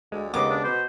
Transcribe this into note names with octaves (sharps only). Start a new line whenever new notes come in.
D2 G#3
D#2 C#3 G#3 B3 D#5 D6
D4
B2 C5